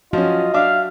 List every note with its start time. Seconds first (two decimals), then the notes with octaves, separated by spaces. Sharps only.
0.13 F3 C#4 F4 F#4 D#5
0.54 D4 E5 F5 D6